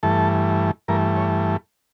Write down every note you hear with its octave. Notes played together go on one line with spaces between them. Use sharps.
G2 E3 A3 A4
G2 E3 A3 A#4
C#5